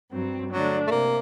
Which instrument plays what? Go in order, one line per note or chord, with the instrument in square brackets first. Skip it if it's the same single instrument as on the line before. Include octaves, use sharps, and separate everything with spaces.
[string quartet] G2 F#3 C4
[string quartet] D3 A3 D4 [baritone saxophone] F#3
[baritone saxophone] A3
[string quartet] C3 [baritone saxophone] A#3